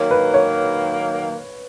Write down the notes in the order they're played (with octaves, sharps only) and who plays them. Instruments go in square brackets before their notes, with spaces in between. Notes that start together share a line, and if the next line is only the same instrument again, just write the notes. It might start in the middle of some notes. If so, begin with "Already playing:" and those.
Already playing: [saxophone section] D#3 F#3 A#3 [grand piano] C#5
[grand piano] B4
C#5